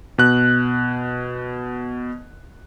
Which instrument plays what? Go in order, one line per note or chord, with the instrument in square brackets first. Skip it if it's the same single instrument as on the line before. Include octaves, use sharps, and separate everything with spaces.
[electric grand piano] B2 F#6